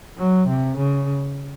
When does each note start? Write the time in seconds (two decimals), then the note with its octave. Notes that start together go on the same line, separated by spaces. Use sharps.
0.18 F#3
0.49 C3
0.78 C#3